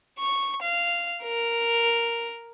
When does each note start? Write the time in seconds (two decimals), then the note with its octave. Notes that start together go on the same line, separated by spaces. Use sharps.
0.19 C#6
0.62 F5
1.23 A#4